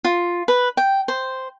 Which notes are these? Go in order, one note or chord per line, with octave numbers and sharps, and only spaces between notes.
F4
B4
G5
C5